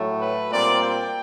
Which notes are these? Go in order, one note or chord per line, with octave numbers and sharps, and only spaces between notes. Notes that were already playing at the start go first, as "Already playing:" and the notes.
Already playing: A2 F#3 A3
B4
A#2 G3 C4 D5
G5